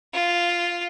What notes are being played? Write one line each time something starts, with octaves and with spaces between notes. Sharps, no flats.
F4